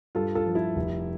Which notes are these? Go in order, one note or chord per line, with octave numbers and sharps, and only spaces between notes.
G2 F4 A4
F4 A4
F3
E4
F1